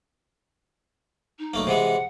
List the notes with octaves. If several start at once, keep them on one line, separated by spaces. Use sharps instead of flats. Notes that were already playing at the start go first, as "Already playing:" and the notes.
D#4
B1 A3 A#3
C3 E3 G#3 F#5